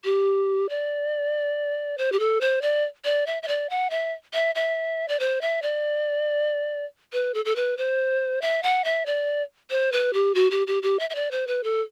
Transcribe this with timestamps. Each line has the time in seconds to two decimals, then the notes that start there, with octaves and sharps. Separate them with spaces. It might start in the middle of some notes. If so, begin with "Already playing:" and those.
0.04 G4
0.69 D5
1.98 C5
2.12 G4
2.19 A4
2.41 C5
2.62 D5
3.05 D5
3.26 E5
3.43 E5
3.48 D5
3.70 F#5
3.90 E5
4.33 E5
4.55 E5
5.08 D5
5.20 C5
5.41 E5
5.62 D5
7.13 B4
7.34 A4
7.45 A4
7.56 B4
7.77 C5
8.42 E5
8.63 F#5
8.84 E5
9.06 D5
9.70 C5
9.92 B4
10.13 G4
10.35 F#4
10.51 G4
10.67 G4
10.83 G4
10.99 E5
11.10 E5
11.15 D5
11.31 C5
11.47 B4
11.63 A4